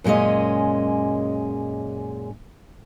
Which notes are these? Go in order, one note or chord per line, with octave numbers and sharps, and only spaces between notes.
F#2 A#2 G#3 C#4 D#5